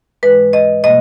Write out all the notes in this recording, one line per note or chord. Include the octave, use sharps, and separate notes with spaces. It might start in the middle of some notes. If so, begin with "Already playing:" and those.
G#2 E3 G#3 B4
D#5
B2 G3 A#3 D#5